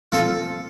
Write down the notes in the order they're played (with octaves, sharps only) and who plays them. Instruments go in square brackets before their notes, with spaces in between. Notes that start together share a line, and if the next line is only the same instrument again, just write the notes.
[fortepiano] F3 C4 [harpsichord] F4 A4